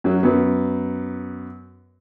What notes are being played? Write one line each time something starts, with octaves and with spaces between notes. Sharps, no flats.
F#2 F#3
F#2 B3